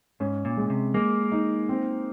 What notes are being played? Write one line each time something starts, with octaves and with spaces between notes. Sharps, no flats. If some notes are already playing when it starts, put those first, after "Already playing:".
G#2 C#4
A#2
G#3
C3
G#3 A#3
D#4
C4